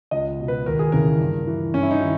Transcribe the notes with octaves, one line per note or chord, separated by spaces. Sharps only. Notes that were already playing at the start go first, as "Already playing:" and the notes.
C#2 D#5
B2
B4
D#2 A#4
G#4
C#3 E3 A#4
G2
E3
G2 C#4
E4
D#4
D#3